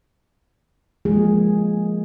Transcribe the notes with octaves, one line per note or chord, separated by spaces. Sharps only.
F3 G#3 A#3 G#4